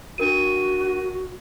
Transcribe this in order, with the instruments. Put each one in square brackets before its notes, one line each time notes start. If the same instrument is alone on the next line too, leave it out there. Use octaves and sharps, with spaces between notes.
[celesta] D4 A#4 D#7 [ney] F#4